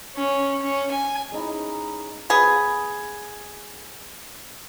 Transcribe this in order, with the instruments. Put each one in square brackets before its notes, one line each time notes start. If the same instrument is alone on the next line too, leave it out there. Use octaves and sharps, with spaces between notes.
[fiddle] C#4
C#4
G#5
[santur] G#3 C#4 D#4 E4
[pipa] B3 G#4